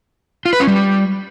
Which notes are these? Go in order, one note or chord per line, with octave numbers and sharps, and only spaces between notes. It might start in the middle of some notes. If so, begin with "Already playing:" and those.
F4
B4
C#4
G3